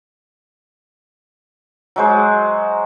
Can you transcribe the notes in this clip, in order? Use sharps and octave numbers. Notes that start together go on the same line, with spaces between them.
F#3 G#3 C5